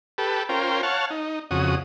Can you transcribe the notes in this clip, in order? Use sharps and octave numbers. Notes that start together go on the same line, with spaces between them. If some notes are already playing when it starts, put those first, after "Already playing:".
G4 A4 B4
C#4 F4 A#4 C5 G5
C#5 F5 F#5 A5
D#4
F2 C#3 F#4 D#6